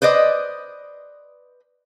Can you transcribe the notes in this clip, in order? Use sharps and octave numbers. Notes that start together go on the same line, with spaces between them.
B4 C5 D5 D#5